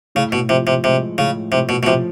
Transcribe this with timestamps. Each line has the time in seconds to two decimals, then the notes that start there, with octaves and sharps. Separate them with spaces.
0.15 A2 C#3
0.32 B2
0.49 C3 F3
0.67 C3
0.84 C3 G#3
1.18 A2 C#3
1.52 A2 C3
1.69 B2
1.83 B2
1.86 C3 F3